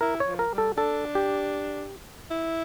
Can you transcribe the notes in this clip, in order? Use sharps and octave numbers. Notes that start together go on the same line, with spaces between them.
E4 A#4
C#5
F3
A#4
G3
A4
D4 A4
G4
E4